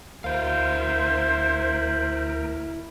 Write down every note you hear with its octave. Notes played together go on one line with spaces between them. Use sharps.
D2 E4 A#4 C5 F5